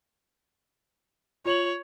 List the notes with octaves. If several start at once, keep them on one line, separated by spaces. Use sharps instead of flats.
F4 C#5 F7 F#7